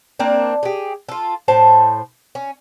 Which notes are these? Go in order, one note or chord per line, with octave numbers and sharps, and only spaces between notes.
A#3 C4 D4
G4 G#4
F4 A4
A2 C5 A5
C#4